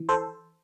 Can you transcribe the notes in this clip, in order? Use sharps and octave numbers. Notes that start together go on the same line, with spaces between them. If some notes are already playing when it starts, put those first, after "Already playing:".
Already playing: E3
A4 C5